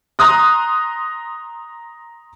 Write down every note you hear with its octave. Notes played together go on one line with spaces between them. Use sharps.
A#5 C6 D#6 F#6